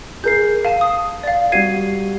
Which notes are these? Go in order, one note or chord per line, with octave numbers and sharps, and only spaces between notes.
G#4 A#4 G6 C7
F5 A5 D#7
D#6
D5 F5
G3 F#4 G#6 C7 D#7